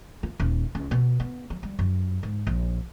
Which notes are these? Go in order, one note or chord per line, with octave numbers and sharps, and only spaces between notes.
F4
D#1
C#2
B2
B3
F#3
G3
F#2
G#2
A#1